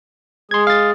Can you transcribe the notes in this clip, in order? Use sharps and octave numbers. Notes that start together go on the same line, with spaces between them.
G#3 G#4 C6 G#6
F5 A6